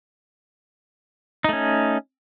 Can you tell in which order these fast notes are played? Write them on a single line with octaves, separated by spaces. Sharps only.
D#4 A3 C#4